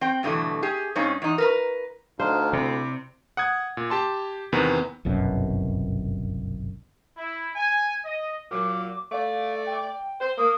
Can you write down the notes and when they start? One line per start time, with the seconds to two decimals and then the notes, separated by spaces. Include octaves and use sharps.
0.01 C4 G5
0.23 G2 B2 D3 E3 A3
0.62 G4 G#4
0.95 G2 C4 C#4 D#4
1.22 E2 D#4
1.38 A#4 B4 A#5
2.20 D2 D4 D#4 C5 F5
2.53 C3 E4 D5
3.37 F#5 D#6 G#6
3.77 A#2
3.90 G4 A5 C6
4.52 E2 C3 D#3 B3
5.05 G1 C2 F#2 B2
7.17 E4
7.55 G#5
8.03 D#5
8.51 A#2 F#3 D6
9.12 A3 D5 F5
9.67 G5
10.20 C5
10.38 A#3 D#6